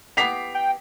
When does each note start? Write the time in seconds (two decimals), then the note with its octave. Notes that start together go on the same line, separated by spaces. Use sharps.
0.17 B3 E4 G4 B6 C7 F7
0.55 G5